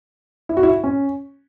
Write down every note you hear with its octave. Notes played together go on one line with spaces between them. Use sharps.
E4
F#4
E4
C#4